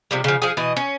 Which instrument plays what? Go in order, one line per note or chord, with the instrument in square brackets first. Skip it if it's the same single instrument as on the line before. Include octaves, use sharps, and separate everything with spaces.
[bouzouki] C3 F3 G3
C#3 F3
F3 G#4
B2 E3 D#5
C#4